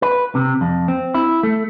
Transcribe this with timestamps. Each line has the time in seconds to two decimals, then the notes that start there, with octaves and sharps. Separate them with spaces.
0.02 B4
0.35 C3
0.61 F2
0.88 C4
1.14 E4
1.43 A3